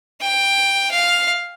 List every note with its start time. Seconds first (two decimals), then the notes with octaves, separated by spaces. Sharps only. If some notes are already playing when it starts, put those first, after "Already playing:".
0.21 G5
0.91 F5